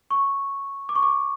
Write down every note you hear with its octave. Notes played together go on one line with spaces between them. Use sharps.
C#6
D6
C#6
D6